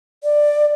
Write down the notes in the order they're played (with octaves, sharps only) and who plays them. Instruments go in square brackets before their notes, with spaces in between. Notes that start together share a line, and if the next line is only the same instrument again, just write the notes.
[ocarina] D5